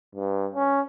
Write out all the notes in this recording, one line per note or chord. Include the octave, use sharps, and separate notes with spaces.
G2
C#4